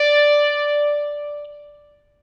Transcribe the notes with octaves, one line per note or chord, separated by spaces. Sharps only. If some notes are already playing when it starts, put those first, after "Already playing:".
Already playing: D5